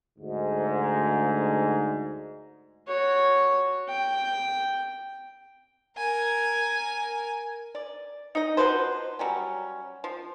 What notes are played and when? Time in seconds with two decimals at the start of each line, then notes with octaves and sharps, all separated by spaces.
0.19 D2 G#2
2.88 F#4 C#5
3.88 G5
5.97 A#4 G#5
7.75 D5
8.35 D#4 D#5
8.57 F3 F#3 B4 C5
9.19 F#3 G3 C#4
10.04 F3